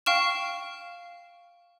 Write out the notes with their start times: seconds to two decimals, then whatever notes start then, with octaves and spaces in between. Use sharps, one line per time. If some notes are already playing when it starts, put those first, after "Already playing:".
0.06 F5 G5 C#6 F6 E7